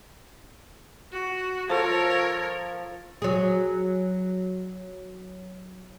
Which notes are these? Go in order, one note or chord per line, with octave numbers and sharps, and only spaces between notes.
F#4
F3 A4 A#4 C#5
F#3 G#4